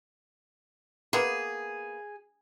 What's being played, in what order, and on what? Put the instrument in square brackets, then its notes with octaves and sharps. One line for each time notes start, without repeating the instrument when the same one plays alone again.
[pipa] A#3 B3 [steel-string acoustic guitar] G#4